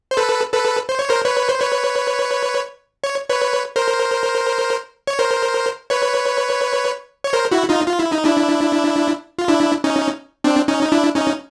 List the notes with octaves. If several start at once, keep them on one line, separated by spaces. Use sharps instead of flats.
C5
A4 B4
A4 B4
C5
C#5
A#4 C5
B4 C#5
C5
B4 C#5
C#5
B4 C#5
A#4 C5
C#5
A#4 C5
B4 C#5
C#5
A#4 C5
E4 F#4
D#4 F4
F4
E4
D#4
D4 E4
F4
D4 E4
C#4 D#4
C4 D4
C#4 D#4
D#4
D4 E4
C#4 D#4